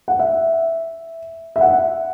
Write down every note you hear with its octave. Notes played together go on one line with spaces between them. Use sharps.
F#5
E5
E5
F#5